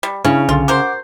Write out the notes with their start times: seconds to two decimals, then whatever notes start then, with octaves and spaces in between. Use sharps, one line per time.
0.03 G3
0.25 C#3 C#4 D4 E4
0.49 B1 D3 F4
0.68 F#4 A#4 C5 F#5 D6